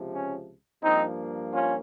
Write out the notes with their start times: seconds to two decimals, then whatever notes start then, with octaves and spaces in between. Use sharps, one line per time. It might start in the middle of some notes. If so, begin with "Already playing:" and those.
Already playing: C#2 C3 F3
0.13 C#4
0.82 G2 F3 A#3 C4 D#4
1.52 C#4 F4